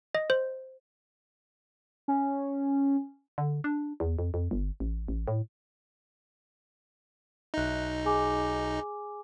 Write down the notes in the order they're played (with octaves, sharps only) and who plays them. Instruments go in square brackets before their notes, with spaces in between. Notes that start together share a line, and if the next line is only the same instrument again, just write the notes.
[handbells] D#5
C5
[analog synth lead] C#4
[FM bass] D3
D4
E2
F2
F2
G1
A1
A1
A2
[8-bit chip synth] B1 D#4 [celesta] E5 F#6
[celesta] G#4 G#5 D6